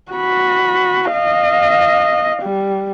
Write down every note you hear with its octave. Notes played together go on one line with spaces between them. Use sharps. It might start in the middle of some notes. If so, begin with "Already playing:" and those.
F#4 B5
D#5 F5
G3